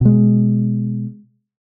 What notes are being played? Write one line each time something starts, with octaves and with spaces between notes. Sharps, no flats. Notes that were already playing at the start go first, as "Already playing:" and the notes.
B2 G#3